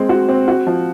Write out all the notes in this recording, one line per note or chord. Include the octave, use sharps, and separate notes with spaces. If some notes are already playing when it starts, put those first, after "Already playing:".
Already playing: G#3 C4
F#4
C4
F#4
F3